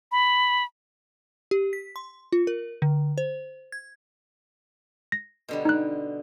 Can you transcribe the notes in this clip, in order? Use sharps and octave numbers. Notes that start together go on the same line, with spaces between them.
B5
G4
B6
C6
F4
A#4
D3
C5
G#6
A#6
B2 D3 G3
D#4 F#6